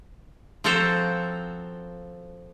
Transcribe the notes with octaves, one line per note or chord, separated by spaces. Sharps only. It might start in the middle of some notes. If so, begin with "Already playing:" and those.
F3 C4 F#4 A4 C5 A#5